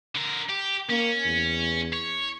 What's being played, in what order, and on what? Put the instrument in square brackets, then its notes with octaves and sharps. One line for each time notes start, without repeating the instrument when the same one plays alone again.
[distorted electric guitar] D3 A#4
G4
[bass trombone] A#3 [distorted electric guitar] C#4
[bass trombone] E2
[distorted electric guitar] C#5